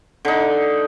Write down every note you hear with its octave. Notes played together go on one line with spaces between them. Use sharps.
D3 D#4